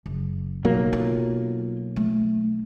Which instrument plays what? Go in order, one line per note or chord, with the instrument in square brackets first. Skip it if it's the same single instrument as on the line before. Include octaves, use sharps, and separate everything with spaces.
[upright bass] F#1
[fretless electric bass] B1 F#3 A#3
[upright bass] F4
A3